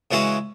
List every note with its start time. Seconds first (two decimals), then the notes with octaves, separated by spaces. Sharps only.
0.11 C#3 E3 G#3 C#4 F#4